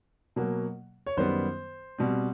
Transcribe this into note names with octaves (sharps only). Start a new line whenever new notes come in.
B2 F#3 A#3
C#5
F#2 D#3 G3 B3 C5
B2 G3 C4